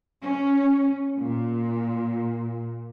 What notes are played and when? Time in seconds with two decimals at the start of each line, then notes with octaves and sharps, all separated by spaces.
0.22 C#4
1.18 A#2